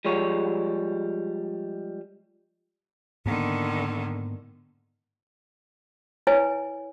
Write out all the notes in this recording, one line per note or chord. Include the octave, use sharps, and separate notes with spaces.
F3 G3 G#3 C#5
G#2 D3 D#3 A#3 B3
E4 B4 C#5 G#5